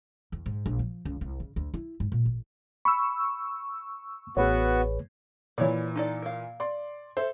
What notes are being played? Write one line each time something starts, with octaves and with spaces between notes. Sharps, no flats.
E2
G#2
A#1
F3
C#2
C2
C#3
D2
E4
G#2
A#2
A1
B5 C#6 E6
A1 B3 F#4 G#4 B4 C#5
A#2 E3 E4 C#5 D5
D#4 A4 D5
A#4 F5
D5 C6
A4 C5 E5